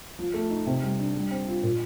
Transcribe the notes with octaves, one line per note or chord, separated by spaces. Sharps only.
F3
A3
D#4
C3
G3
D4
G3
C4
F4
A#2